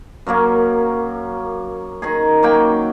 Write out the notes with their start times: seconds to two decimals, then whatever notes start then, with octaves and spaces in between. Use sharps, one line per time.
0.27 F#2 F#3 A#3 C#4
2.02 D#3 D#4 G#4
2.43 F#3 A#3 G5